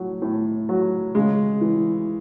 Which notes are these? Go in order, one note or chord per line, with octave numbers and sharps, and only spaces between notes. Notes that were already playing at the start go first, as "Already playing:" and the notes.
Already playing: A2 F#3
A2
F#3
C#3 G#3
E3